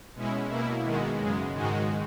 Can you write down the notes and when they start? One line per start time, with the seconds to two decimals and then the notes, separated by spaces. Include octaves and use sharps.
0.14 B2 G#3 C#4 E4
0.48 B2 A#3 E4
0.84 D#3 G#3 B3 F#4
1.19 F#2 C#3 G#3
1.54 G#2 D#3 G#3 D#4 F#4